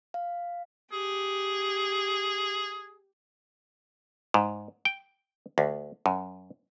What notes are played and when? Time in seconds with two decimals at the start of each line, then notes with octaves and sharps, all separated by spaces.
0.14 F5
0.92 G4 G#4
4.34 G#2
4.85 G5
5.58 D2
6.06 F#2